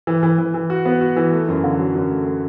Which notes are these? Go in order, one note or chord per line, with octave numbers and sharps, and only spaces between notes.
E3
E3
E3
E3
F#4
B3
F#4
E3
A3
F#2
D3
F#3
F#2
A3
A3